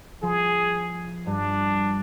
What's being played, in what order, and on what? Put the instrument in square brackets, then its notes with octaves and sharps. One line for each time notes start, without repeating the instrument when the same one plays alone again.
[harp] F3 C6 [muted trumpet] G#4
[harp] G2 [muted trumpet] D4